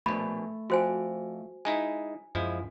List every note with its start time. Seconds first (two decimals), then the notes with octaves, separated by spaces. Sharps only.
0.06 A#1 B2 A3 B5
0.70 F2 F#4 C5 G#5
1.65 G#3 D#4 E4 G#5
2.35 F#2 F3 G#3 E4